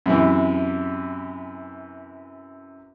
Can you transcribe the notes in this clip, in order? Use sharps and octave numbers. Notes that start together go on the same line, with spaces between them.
F#2 C3 E3